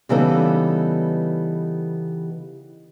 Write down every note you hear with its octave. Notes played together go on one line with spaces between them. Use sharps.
C#3 E3 G3 B3 D#4 A4